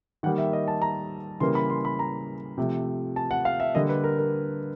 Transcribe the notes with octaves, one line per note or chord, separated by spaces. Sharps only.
D#3 G3 A#3 F#5
E5
D#5
A5
A#5
C#3 E3 G3 A#3 C6
B5
C6
B5
A#5
C3 F3 A3
A5
F#5
F5
E5
D3 G3 A#3 D#5
B4
A#4
A#4